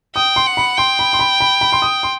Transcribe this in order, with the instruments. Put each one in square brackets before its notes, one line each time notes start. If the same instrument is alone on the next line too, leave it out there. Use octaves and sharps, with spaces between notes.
[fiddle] G5 [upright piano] D#6
[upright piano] C6
[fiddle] F#5
[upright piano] B5
[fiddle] G5 [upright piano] C6
[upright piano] B5
C6
B5
B5
B5
C6
D#6
C6